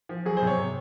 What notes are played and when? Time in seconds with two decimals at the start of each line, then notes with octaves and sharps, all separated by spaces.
0.09 F3
0.25 F#3 G#4
0.37 C3 C5
0.47 C#5
0.58 C3